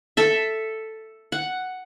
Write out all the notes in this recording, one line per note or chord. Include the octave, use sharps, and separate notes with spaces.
A4 E5
F#5